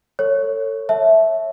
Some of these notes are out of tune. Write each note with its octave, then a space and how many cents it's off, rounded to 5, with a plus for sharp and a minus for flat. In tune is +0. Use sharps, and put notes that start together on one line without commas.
A4 +35 C#5 +0
C#5 +0 E5 -10 A5 -25